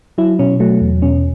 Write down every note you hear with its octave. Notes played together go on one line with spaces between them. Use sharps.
F#3 E4
B2 C#4
F#3 A3
E2
B2 C#4